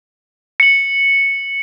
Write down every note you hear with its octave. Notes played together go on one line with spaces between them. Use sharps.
C#7 F#7